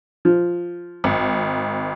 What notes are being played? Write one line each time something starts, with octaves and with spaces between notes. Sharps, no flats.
F3
G#1